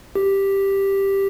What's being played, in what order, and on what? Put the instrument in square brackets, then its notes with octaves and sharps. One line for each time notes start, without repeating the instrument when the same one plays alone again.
[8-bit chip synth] G4